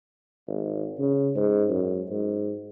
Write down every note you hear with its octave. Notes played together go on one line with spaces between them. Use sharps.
G#1
C#3
G#2
F#2
G#2